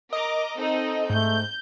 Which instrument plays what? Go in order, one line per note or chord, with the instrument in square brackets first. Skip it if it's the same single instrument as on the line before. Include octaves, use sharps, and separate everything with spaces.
[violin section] A#4 A#5 D6 [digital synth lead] D#5
[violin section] C4 D#4 A4
[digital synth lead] G#2 [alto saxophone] A3 [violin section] G6